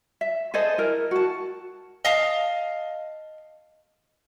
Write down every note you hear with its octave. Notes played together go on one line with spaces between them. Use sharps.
E5
G#4 A4 C5 D#5
E4 A#4
F#4 A5
D#5 F5 A5